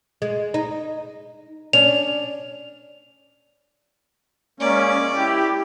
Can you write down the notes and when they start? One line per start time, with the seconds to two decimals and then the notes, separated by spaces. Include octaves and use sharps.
0.22 G#3
0.54 D#4
1.73 C#4 D4 F7
4.60 G#3 A#3 C#4 D5
5.15 E4 G4